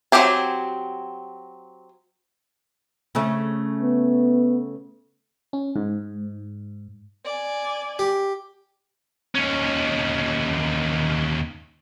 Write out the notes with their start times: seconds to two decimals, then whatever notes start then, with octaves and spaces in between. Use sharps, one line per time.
0.12 F#3 G#3 C4 G4 G#4
3.15 C#3 A3 C#4
3.82 B3
5.53 C#4
5.76 G#2
7.25 D5 G#5
7.99 G4
9.35 D#2 C#4